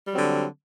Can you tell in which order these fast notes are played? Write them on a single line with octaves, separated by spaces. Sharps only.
G3 F#3 C4 D3